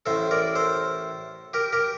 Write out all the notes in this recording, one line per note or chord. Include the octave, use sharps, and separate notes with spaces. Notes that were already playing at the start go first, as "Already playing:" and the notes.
A1 A2 A3 A4 C5
A#4 D5
A4 C5
G4 A#4
G4 A#4